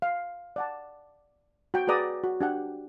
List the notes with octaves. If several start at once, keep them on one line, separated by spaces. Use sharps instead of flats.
F5
D5 F#5 A5
F#4 G5
F#4 G#4 B4 D5 A#5 D#6
F#4
D4 G4 F#5